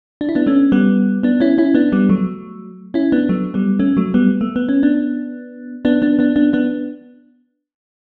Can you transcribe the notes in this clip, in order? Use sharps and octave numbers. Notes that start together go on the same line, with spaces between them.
D4
E4
B3 D4
A3 C#4
G3 B3
B3 D4
C#4 E4
C#4 E4
B3 D4
G3 B3
F#3 A3
C#4 E4
B3 D4
F#3 A3
G3 B3
A3 C#4
F#3 A3
G3 B3
A3
B3
C#4
B3 D4
B3 D4
B3 D4
B3 D4
B3 D4
B3 D4